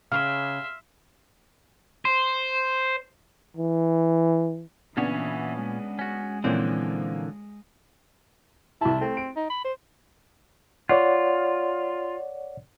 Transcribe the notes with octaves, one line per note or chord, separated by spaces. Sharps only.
C#3 E5 F5 C6 F6
C5
E3
A#2 C#3 E3 B3 C#4 D4 C#5
G#3
C#4 F#4
A#2 D3 E3 F3 A#3 C4 C#4
C2 E4 A5
A3 C4
D7
D#4
B5
C5
F4 C#5 D5 F#5